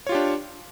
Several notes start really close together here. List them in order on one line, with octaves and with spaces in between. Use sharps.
C#5 F4 G4 D4